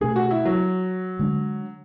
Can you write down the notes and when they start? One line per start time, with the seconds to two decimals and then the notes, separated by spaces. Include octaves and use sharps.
0.01 B2 A3 D4 G#4
0.16 F#4
0.31 E4
0.45 F#3
1.19 D3 G#3 D4